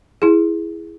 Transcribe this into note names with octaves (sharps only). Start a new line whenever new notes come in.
E4 G#4